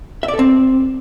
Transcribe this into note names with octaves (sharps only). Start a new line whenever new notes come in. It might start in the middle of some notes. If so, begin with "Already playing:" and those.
E5
D5
A4
C4